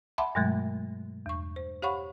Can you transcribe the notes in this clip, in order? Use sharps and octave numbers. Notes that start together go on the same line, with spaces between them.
E5 F#5 A5 B5 C6 D6
G2 B2 F#3 G#3 A3
E2 C#6
C5
G4 C#5 F5 F#5 B5 C#6